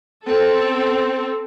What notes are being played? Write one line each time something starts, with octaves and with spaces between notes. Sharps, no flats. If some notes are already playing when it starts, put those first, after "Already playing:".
C4 A4